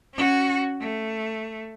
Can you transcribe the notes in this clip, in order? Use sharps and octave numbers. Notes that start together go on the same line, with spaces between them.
C#4 F#4
A3